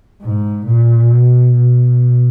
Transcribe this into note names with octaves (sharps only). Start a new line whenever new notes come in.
G#2
A#2
B2
B2